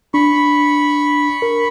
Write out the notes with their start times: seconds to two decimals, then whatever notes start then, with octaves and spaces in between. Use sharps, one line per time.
0.14 D4 B5 C#6
1.42 A#4